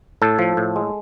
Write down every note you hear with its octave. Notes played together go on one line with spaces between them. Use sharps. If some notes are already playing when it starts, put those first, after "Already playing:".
A2 A4
F3
A2
G#3